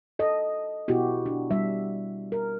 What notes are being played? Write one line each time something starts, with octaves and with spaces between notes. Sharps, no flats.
A4 D#5
B2 B3 E4 F#4 G4
D4
G3 E5
A#4